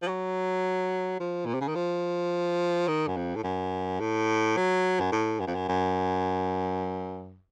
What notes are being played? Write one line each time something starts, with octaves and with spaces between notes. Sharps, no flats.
F3
F#3
F3
A#2
C3
C#3
D#3
F3
D#3
F#2
F2
A2
F#2
A2
F#3
F#2
A2
F#2
F2
F#2
F#2